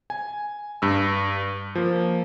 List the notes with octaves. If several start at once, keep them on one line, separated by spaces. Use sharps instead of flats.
G#5
G2 E6
F3 A#3